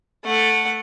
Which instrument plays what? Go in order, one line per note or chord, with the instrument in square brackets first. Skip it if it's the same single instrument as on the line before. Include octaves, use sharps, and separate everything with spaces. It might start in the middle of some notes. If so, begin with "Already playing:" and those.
[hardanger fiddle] A3 F#5